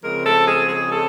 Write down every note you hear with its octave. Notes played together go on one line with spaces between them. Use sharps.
C#3 F3 G#3 C4 A#4
A4
G#4
G#4
A4